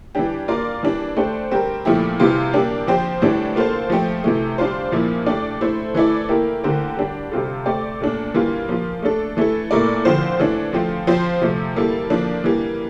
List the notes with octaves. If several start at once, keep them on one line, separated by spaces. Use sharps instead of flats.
E3 G3 D4 G4
A#3 F4 A#4 D5
E3 G3 D4
A3 D4 G4 C5
G3 C4 G4 A#4
A#2 F3 A3 E4 G4
C3 E3 G3 C4 F4
G3 A#3 D4 G4
F3 C4 G4 C5
A2 E3 G3 D4
A#3 F4 A4 C5
F3 A3 C4 G4
C3 E3 A3
G3 D4 F4 C5
A#2 F3 A#3 E4
A3 D4 G4 D5
A3 E4 A4 C5
E3 A3 E4 A4 D5
A#3 E4 G4 A#4
D3 A3 C4 G4 A#4
G3 D4 G4
C3 G3 C4 F4 A4
A3 C4 G4 D5
A#2 A3 D4
E3 G3 A#3 F4
F3 A#3 F4
A3 D4 A4
E3 A3 E4 A4
A#2 A3 E4 A#4 D5
D3 F3 C4 F4 C5
E3 A3 D4
F3 A3 C4 F4
F3 C4 F4 C5
C3 F3 A3
G3 A#3 E4 A4
F3 A#3 D4
E3 G3 A#3